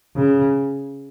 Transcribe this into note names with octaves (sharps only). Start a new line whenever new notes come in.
C#3